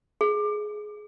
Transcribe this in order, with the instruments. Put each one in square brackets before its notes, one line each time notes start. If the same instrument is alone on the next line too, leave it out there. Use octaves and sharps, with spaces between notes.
[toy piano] G#4